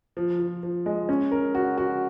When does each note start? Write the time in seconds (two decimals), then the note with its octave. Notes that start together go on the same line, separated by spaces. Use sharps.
0.17 F3
0.40 F3
0.63 F3
0.86 G#3
1.09 C#4
1.31 A#4
1.55 F#4
1.78 F#4